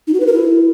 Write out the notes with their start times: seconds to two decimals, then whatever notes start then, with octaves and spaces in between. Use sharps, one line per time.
0.07 D#4
0.14 F#4
0.20 B4
0.27 A#4
0.33 E4